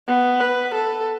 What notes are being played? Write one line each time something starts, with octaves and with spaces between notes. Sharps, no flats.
B3
B4
A4